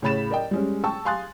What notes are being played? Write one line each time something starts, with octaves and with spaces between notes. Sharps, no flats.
A2 C#3 C#5 B5 A6 E7
A#4 D5 D#5 G5
G3 G#3 C#4
G5 A5 C#6 E6
F5 G#5 C6 D#6 F#6 A6